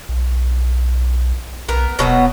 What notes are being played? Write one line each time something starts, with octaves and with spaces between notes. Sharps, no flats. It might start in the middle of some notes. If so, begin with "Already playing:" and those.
B1
B1 B3 A#4
D#1 B2 F#3 B3